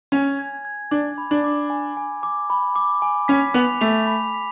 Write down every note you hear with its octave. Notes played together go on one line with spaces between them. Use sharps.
C#4 G#5
G#6
G#6
D4 D6
B5
D4
D6
G#5
G#5
D6
B5
D6
G#5
C#4 B6
B3 F7
A3 F7
B5
B6